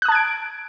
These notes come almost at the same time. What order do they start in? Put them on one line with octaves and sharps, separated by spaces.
F#6 D#6 A5 G#6 D7